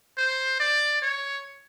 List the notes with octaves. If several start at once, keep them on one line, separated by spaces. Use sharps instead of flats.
C5
D5
C#5